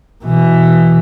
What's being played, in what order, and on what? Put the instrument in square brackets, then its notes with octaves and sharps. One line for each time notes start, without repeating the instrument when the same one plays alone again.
[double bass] B2 E3